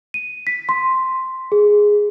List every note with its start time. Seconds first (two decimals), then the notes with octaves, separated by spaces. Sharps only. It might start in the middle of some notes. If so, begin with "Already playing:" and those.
0.14 D#7
0.47 B6
0.69 C6
1.52 G#4